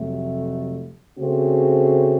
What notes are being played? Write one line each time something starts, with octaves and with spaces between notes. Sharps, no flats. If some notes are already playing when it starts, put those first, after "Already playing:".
Already playing: F2 C3 F#3 A3
C#3 A3 C4 F#4 C5